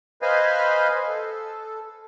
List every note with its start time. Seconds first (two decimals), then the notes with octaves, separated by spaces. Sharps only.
0.22 B4 C5 D#5 F5 G#5
1.07 A4